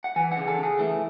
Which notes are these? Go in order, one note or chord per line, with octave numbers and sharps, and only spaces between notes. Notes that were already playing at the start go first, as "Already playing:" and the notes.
F#5
E3 G#5
F#5
C#3
A4
C#3 G#4
E3 A3